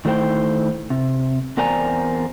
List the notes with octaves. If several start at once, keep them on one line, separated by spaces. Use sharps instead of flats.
D#3 A3 E4 C5 G5
C3
E2 C4 A#4 D5 G#5 A#5